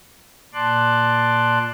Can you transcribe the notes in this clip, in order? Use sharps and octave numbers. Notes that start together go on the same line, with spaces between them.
A#2 D5 A5 C6 D6 F#6